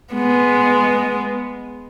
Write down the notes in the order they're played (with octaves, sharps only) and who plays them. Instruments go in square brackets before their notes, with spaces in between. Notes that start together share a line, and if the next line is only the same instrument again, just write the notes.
[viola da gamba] G#3 B3